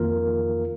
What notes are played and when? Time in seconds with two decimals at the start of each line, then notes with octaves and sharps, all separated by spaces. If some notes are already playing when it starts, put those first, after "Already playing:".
Already playing: F2 D#3 A#3 F4 A#4